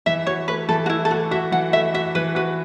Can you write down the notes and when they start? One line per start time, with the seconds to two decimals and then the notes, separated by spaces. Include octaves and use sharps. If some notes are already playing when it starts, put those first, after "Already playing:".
0.06 E3 E5
0.27 F#4 C#5
0.48 A3 B4
0.69 E3 A4
0.86 F#4
0.89 A3 E4
1.05 A4
1.11 A3 F#4
1.31 F#4 E5
1.52 E3 F#5
1.73 A3 E5
1.94 F#4 E5
2.15 E3 B4
2.35 F#4 B4